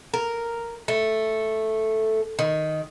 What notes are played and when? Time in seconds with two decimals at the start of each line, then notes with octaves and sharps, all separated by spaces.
0.14 A#4
0.88 A3
2.39 D#3